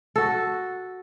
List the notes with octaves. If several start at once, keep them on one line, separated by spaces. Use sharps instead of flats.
F#4 A4